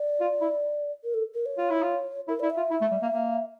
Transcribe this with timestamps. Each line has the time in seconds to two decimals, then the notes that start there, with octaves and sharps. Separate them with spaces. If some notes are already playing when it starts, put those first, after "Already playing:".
Already playing: D5
0.20 F4
0.41 E4
1.04 A#4
1.14 A4
1.34 A#4
1.46 C#5
1.58 F4
1.70 E4
1.82 F4
2.28 E4 A#4
2.40 E4 D5
2.50 E5
2.57 F4
2.71 E4
2.81 A3
2.92 G3
3.02 A#3
3.12 A#3